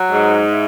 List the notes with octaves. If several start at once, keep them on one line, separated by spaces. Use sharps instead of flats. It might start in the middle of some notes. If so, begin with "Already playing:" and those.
Already playing: F#3
G#2
E4